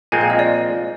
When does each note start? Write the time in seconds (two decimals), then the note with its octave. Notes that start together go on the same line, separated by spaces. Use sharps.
0.12 A#2 F3 G#3 C4 G#5
0.21 F5
0.30 D#5
0.39 D5